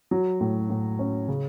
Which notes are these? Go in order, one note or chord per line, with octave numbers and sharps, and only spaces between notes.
F#3
A2
A2
C#4
C#3